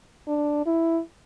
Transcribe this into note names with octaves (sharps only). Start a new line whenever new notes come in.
D4
E4